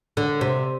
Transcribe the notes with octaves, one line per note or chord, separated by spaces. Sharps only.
D3
C3